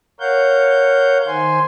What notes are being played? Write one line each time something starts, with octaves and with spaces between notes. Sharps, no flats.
A#4 C#5 F5 F#5 G6
D#3 C5 G#5 C6